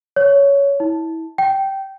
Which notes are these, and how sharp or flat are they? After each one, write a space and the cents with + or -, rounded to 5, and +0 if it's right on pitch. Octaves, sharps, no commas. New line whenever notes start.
C#5 +15
E4 -25
G5 -10